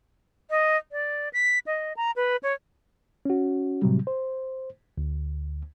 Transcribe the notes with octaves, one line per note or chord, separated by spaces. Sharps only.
D#5
D5
B6
D#5
A#5
B4
C#5
C#4 F#4
A2 C3 F#3 G3
C5
D2